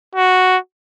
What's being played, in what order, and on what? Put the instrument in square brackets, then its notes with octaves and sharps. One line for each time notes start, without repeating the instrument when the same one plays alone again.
[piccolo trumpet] F#4